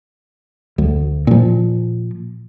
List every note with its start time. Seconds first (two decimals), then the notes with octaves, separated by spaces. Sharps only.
0.78 D2
1.27 A#2 F3